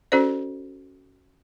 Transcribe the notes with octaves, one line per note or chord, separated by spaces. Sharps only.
C#4 F#4 A4 C5 D5